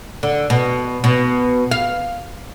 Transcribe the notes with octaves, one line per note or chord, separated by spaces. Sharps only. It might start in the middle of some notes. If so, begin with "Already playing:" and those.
D3
B2
B2
F5